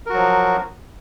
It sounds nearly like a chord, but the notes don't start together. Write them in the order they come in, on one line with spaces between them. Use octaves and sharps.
A#4 F#4 F#3 F3